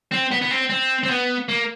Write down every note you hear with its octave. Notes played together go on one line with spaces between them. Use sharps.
C4
B3
B3
C4
C4
C4
B3
A#3